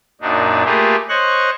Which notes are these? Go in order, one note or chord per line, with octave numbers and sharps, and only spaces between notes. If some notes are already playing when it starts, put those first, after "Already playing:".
F#2 A#2 D4 D#4
A3 A#3 F4 G4 G#4 B4
C5 C#5 D#5 C#6 F#6